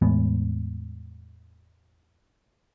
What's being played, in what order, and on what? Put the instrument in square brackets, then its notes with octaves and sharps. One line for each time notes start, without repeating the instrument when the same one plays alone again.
[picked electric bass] E2 A2 G#3 B3